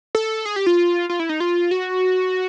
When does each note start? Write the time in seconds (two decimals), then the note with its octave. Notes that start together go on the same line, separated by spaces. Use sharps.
0.15 A4
0.45 G#4
0.56 G4
0.66 F4
1.09 F4
1.20 E4
1.29 D#4
1.40 F4
1.71 F#4